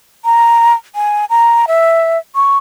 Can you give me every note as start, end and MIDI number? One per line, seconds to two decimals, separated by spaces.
0.25 0.74 82
0.95 1.25 80
1.30 1.66 82
1.68 2.18 76
2.35 2.58 85